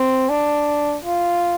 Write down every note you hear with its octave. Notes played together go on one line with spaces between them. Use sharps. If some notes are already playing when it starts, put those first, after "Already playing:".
Already playing: C4
D4
F4